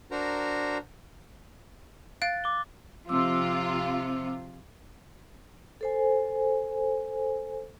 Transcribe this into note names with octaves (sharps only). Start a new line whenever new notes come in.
D4 F#4 A#4 C5 A#5
F5 F#6 A6 D7
D6 G7
C3 F3 C4 F4 D6 E6
A4 C5 G#5